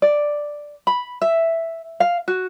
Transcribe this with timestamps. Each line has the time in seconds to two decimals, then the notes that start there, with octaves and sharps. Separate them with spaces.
0.02 D5
0.87 B5
1.22 E5
2.00 F5
2.28 F#4